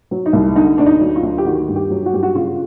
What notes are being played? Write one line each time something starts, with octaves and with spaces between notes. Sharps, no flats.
F#3
D#4
C2
D3 D#4
D2 D4
D#4
F#3
F4
D2
G4
D#3 F#4
G2
G4
F#3
F#4
G2 G4
F#4
C#3 F4